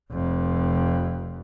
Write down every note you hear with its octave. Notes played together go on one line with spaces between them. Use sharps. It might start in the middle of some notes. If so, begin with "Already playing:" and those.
F1 F2